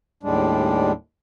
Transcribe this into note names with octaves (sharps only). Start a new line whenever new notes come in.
D#2 A2 G3 G#3 D4